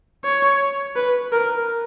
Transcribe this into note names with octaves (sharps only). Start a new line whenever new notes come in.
C#5
B4
A#4